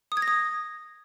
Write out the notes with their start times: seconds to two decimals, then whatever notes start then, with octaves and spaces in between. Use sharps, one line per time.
0.12 D#6
0.17 G#6
0.22 A#6
0.28 D#6